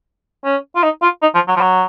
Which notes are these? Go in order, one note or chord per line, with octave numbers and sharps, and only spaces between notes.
C#4
F4
D#4
F4
D#4
F3
F#3
F3
F#3